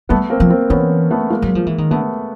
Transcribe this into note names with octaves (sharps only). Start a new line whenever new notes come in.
G3 A3 B3
A#3 C4
F3
A#3 C4
E3 B3 C#4
A3 B3
G#3 A#3
F#3
F3
E3
D#3
D3 A3 B3